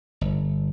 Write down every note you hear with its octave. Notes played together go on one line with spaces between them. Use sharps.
G1